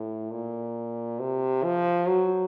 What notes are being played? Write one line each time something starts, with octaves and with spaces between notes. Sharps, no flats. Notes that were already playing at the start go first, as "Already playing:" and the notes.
Already playing: A2
A#2
C3
F3
F#3